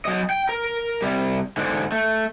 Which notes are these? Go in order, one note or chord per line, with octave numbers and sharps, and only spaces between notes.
F#3 D#5
G5
A#4
C3 G3
G#2 D3
A3